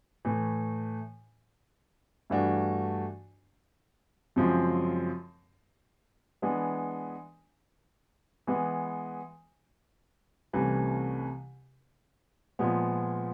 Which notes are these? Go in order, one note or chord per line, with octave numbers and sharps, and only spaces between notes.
A2 E3 A3
G2 E3 A3 D4 F#4
F#2 C#3 F3 G#3 C4
E3 G#3 B3 D4
E3 G#3 B3
C2 C3 E3 A3 C#4
A#2 F3 G#3 B3